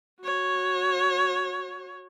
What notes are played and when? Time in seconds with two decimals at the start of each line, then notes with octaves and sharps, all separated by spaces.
0.22 F#4 C#5